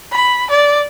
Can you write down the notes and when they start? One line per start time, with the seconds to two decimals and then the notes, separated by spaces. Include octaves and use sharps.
0.12 B5
0.50 D5